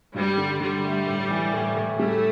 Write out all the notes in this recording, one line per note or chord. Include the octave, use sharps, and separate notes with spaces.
G2 G3
D3
D3 G3
A3
A2
E3
A2
A2
G3 A3